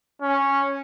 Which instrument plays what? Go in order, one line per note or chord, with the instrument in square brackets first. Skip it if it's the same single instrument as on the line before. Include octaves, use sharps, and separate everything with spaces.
[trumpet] C#4